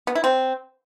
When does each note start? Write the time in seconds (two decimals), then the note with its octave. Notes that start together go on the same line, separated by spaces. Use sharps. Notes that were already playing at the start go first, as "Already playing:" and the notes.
0.07 B3
0.15 E4
0.24 C4